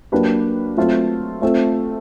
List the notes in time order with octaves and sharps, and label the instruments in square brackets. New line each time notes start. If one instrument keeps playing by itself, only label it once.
[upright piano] F#3 A#3 D4 G4 B4
F#3 A3 C4 F4
A3 C4 F4 A4